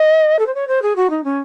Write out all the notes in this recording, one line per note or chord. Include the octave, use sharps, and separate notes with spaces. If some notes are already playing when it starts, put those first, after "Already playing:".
Already playing: D#5
A4
C5
C#5
C5
G#4
F#4
D#4
C#4